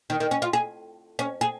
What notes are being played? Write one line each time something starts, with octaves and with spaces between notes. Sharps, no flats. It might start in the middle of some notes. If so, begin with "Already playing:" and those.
D#3
D#3
C#4
F4
G#4
C#4
G#4